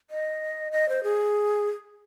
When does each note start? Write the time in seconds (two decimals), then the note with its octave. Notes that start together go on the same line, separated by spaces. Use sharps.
0.10 D#5
0.72 D#5
0.89 C5
1.04 G#4